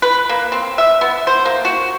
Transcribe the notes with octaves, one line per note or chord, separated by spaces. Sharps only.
B4
A#3
C4
E5
B3
C5
A#3
F#4